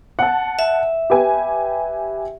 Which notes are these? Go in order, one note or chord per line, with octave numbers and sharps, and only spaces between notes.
F#5 A5
E5
G4 B4 G#5